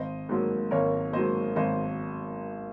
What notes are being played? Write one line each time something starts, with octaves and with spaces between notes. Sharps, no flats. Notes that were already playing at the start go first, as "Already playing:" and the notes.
Already playing: G#1 C5 D#5
G#2 F#3 A#3
G#1 A#4 C#5
G#2 F#3 A#3 C5 D#5
G#1 C5 D#5